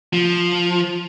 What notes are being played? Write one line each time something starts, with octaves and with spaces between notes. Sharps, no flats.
F3